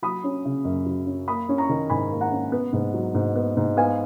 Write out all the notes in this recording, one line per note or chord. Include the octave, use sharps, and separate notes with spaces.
F#3 B5 D#6
C#4
C#3
F#2
F#3
C#4
A#3 B5 D#6
C#4
A#5 C#6
D#3
G#2 G#5 B5
A#3
F#5 A#5
C#4
B3
G#2
F#3
G#2
B3
G#2
B3 F5 G#5